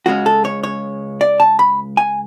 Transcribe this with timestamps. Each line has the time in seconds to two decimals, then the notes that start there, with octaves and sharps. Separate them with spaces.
0.06 C#2 C#3 G#3 C#4 F#4
0.26 A4
0.45 C#5
0.63 C#5
1.21 D5
1.40 A5
1.59 B5
1.97 G#5